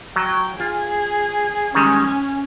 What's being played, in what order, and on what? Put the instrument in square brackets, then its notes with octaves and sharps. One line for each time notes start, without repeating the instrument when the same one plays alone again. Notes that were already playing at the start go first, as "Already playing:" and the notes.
[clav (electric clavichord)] F#3 [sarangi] G5
[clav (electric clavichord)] F4 [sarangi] G#4
[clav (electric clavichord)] D#3 G3 G#3 [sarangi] C#4
[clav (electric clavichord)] G#5